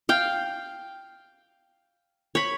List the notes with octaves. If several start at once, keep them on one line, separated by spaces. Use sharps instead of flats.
F5 G5
C#5 B5